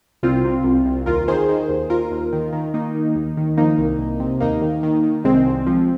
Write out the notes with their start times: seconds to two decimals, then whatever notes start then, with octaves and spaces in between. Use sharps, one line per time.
0.23 C2 C4 F4
0.44 C3
0.64 C2
0.86 C2
1.06 D#2 F4 A#4
1.28 D#3 G#4 C5
1.49 D#3
1.69 D#2
1.90 D#2 F4 A#4
2.11 D#2
2.33 D#3
2.53 D#3
2.74 D#3 A#3 D#4
2.95 D#3
3.15 D#2
3.37 D#3
3.57 F3 A#3 D#4
3.78 C2
3.99 C2
4.20 C3
4.40 D#2 A#3 D#4
4.62 D#3
4.83 D#3
5.03 D#3
5.24 C2 G#3 C4
5.46 C2
5.66 F3